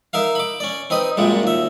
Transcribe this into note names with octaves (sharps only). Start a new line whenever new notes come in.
D#4 A#4 E5 F5
B5 D6
C#4 D5
C4 D#4 B4 D#5
F#2 A#2 G3 G#3
D#2 E5